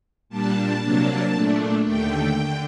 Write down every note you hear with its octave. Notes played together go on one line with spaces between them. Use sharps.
A#2 G3 D4 A5
C3 F#3 A#3 D4
A#2 A3 D4
D#2 D3 A3 G5
D3